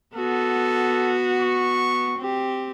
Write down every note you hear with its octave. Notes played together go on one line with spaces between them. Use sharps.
B3 F#4 A4
C#6
C4 G4